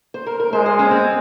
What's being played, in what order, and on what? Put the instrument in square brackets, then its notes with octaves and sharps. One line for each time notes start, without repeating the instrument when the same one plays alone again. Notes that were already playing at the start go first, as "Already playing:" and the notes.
[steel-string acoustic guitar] C5
A#4
A#4
[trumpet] G#3 [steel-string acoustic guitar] C5
[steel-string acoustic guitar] C5
C#4
C4